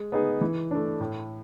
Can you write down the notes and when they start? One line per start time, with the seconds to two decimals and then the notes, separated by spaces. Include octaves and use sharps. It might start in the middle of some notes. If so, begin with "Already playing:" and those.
Already playing: G#3
0.12 B3 D#4 G#4
0.41 E3
0.71 A3 D4
1.00 A2